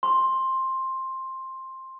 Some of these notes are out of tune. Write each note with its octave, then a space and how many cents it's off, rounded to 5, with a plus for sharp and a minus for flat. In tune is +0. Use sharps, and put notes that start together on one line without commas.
C6 +10